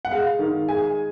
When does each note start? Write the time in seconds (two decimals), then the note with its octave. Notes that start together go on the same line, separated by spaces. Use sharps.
0.05 F#5
0.11 G#3 F5
0.39 D#3
0.68 G#3 G#5